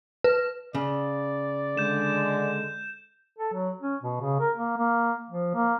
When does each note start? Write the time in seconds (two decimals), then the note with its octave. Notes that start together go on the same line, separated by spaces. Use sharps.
0.24 B4
0.75 C#3 D5
1.77 D3 G#3 G6 E7
3.38 A4
3.53 F#3
3.81 C#4
4.03 B2
4.21 C#3
4.40 A#4
4.57 A#3
4.77 A#3
5.30 F3
5.54 A#3